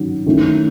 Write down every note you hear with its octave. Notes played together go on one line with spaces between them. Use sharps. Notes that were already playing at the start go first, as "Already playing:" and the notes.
Already playing: D#3 F#3 C#4
D#3 A3 C#4 E4